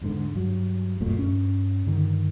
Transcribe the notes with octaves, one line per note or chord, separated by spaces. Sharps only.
E2 G#2 D3
G2 F#3
D1 F#2 A#2 A3
G2 C#4
G2 D3 D#3